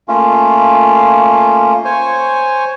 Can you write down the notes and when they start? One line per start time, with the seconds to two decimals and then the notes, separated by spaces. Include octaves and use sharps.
0.08 A3 A#3 C#4 F4
1.85 C5 C#5 G#5 C#6